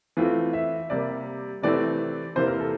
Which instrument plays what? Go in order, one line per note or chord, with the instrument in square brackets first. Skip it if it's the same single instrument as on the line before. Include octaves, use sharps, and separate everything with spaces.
[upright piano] E3 A3 C4 F4
E5
C3 G3 A#3 D5
C3 E3 A3 C4 D5
C3 E3 A#3 C5
A#4
A4